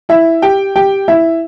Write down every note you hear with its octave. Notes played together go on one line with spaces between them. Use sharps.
E4 E5
G4 G5
G4 G5
E4 E5